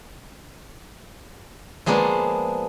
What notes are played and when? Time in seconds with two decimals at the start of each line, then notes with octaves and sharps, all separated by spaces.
1.86 F3 G#3 A#3 B3 D4